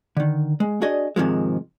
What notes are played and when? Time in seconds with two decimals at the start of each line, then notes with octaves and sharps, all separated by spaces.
0.17 D3 D#3
0.60 G#3
0.82 D4 F#4 G#4 D5 D#5
1.16 G#2 C3 D#3 F3 G#3